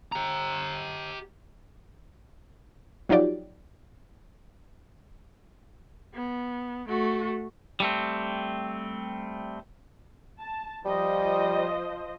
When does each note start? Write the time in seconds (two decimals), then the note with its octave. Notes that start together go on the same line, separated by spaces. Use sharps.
0.12 G4 A#5
3.09 F3 F#3 D#4 F4 G4 D5
6.14 B3
6.88 A3 F#4
7.80 G3 A3 C4
10.39 A5
10.85 F3 G3 C5 D#5